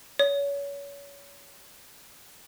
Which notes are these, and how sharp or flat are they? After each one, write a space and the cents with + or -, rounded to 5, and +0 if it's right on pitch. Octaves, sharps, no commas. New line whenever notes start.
C#5 +30